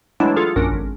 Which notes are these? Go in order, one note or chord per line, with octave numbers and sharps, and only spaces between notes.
E3 F#3 G#3 A3 D4 E4
F4 G#4 A4
A#1 F#2 C#4 D4 A#4
G#1